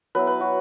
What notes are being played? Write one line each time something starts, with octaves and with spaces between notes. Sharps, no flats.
F#3 B3 E4 B4
B4
F#4